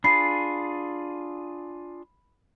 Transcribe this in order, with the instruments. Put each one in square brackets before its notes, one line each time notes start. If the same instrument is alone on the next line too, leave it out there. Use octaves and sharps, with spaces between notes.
[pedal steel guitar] D4 F4 G#4 [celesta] B5 C7